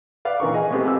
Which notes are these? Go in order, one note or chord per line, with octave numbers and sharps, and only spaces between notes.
B4 D5 F5
A#2 D#3 E3 A#4 C#6
G#4 D#5 G#5
G#3 A3 B3 C4 G4
F2 G4 E6